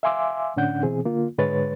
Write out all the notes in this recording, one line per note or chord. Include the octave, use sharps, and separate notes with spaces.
E5 F5 G#5 C6 D6 E6
A2 D3 C#4 D4 F#5 G6
B2 E3 C4 G#4
D3 A#3 F4
G#2 D3 G#3 B4 C#5 A6